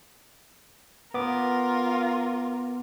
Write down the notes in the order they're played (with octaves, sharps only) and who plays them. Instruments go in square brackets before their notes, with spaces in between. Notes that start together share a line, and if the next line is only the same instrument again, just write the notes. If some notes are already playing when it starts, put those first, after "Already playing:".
[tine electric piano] B3 D6 [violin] F4 A#4